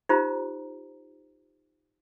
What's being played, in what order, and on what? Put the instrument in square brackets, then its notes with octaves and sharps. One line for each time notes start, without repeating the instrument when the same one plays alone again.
[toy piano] D#4 F4 G4 C5 A#5